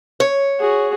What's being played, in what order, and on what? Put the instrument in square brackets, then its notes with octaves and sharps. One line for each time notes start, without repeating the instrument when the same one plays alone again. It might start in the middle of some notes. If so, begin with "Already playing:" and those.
[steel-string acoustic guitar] C#5
[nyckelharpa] F#4 G#4